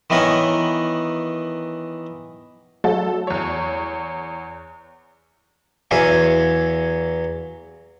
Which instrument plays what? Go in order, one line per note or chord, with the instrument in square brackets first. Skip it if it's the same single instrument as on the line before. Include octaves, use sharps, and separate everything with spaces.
[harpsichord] D#3 E3 B3 A#4 C#5
[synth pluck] F#3 A3 [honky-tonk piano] A4
[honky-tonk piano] E2 C#5
[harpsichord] E2 F#3 C#5 E5 F5 G#5